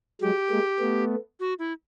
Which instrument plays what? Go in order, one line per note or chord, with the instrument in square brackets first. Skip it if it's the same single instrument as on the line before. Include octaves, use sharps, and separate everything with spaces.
[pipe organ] F#3 G#3 [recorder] G4
[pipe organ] G#3 A#3
A3 B3
[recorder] F#4
E4